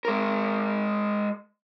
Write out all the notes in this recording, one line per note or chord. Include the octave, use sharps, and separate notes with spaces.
G#3 A#4